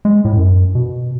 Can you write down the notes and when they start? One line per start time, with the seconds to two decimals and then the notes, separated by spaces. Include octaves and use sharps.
0.05 G#3
0.25 A2
0.37 F#2
0.75 B2